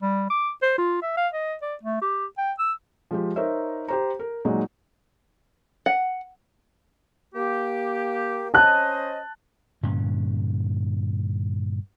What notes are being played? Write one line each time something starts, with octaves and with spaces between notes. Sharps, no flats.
G3
D6
C5
F4
E5
F5
D#5
D5
A3
G4
G5
E6
F3 G#3 G4
D#4 A#4 C5 C#5 E5
G4 C5 A#5
A#4
A#2 F#3 G#3 D#4
F#5
A#3 G4
C#4 C5 D#5 A5 F#6
G2 A#2 D3 C#4